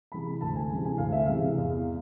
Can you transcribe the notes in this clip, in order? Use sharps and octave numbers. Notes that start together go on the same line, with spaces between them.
C3 E3 G#3 B5
D2 A5
G#5
C3 E3 G#3
G#5
D2 F5
E5
C3 E3 G#3 F5
E2